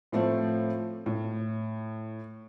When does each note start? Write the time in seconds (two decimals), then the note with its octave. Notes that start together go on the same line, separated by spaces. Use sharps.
0.12 A2 F3 A3 C4
1.06 A2